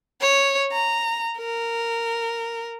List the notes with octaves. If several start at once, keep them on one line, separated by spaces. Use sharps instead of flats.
C#5
A#5
A#4